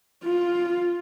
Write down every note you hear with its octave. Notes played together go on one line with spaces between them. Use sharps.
F4